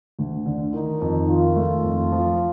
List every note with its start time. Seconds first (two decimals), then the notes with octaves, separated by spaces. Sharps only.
0.19 D2
0.46 D3
0.74 D#3 D#4
1.01 F2
1.28 D#3 F4
1.56 A3
1.84 F2
2.12 F3